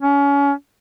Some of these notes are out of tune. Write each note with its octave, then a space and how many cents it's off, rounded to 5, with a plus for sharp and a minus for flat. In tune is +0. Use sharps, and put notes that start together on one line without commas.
C#4 +30